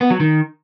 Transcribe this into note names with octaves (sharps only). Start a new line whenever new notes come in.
B3
F#3
D#3